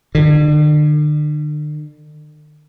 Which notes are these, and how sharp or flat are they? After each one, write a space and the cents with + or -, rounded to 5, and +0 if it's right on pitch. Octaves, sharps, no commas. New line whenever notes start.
D3 +40